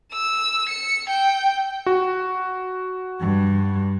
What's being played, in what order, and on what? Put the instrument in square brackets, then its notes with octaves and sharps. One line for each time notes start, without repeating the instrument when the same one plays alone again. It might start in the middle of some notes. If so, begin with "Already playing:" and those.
[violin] E6
C#7
G5
[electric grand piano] F#4
[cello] G2